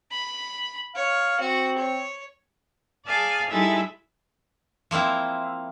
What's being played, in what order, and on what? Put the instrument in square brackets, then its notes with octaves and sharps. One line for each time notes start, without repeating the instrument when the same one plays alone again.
[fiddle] B5
[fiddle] C#5 [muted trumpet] F5
[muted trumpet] C4 [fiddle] F#4
[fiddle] C#5
[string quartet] G#4 D5 F5 G#5 A5
G3 G#3 D#4 E4 A4 E5
[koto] F3 A#3 C4 E4